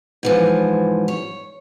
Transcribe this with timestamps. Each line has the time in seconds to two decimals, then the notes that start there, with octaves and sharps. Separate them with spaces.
0.23 G#2 E3 F3
1.08 C#5